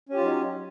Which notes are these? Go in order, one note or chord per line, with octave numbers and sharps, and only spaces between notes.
F#3 C#4 D#4 F4 G4